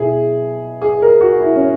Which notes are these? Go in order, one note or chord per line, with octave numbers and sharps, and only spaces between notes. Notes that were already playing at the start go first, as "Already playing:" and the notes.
Already playing: B2 E4 G#4
G#4
A#4
F#4
E4
C#4